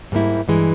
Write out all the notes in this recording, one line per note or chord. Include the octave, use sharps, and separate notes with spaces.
G#2 G3 A#3 E4
G2 E3 G#3